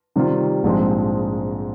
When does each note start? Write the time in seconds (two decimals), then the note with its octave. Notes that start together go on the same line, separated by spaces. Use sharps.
0.16 C3 D#3 G3 C4 F4
0.64 A#1 G#2 F3 G#3 C4